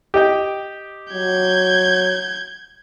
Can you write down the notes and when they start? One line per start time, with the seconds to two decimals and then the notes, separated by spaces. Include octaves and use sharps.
0.14 G4 D#5 G5
1.13 F#3 G6 G#6